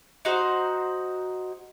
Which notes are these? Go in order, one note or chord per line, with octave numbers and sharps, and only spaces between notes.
D#4 F#4 C5